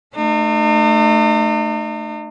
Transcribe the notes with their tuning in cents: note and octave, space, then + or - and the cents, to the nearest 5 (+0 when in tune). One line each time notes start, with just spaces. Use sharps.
A3 +0 D#4 -45